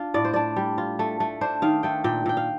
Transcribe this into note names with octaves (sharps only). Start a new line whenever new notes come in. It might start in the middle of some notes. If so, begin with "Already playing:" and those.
Already playing: D4 F4 F5
A2 D5
C5
D4 D5
G3
F4
A3
A3
D4 C5
D#3 F5
A3 G5
A#2 G5
A#2 G5
F5